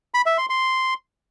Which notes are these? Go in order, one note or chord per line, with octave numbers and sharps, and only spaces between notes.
B5
E5
C6
C6